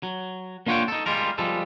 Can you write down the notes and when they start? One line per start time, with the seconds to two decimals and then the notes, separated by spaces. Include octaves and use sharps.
0.03 F#3
0.66 A#3 D4 F4 C#5 F#5 G5
0.88 D#4 A4
1.06 G3 G#3 F4 A#4
1.38 F3 G3 G#3 A4